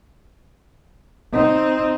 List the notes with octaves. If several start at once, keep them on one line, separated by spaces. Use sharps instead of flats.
C4 D#4